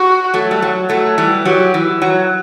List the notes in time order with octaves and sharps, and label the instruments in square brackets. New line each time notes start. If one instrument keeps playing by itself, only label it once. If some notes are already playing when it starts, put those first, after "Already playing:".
Already playing: [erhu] F#4
[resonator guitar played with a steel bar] F#3 A3
G3
F#3
F#3 A3
E3 G3
[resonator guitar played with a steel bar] F#3 [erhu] G4
[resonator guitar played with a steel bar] E3
F#3